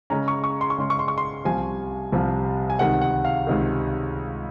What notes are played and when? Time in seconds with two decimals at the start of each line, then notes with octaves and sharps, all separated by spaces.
0.10 C#3 G#3 C#4 A#5
0.28 C#6
0.44 C#6
0.61 C6
0.70 C#6
0.78 C#3 G#3 C#4 C6
0.90 C#6
0.99 C6
1.08 C#6
1.18 C6
1.45 C2 C3 F3 G#5
2.12 C2 C3 F3
2.70 G#5
2.79 C#2 C3 D#3 F#5
3.01 F#5
3.25 F5
3.47 C#2 C3 D#3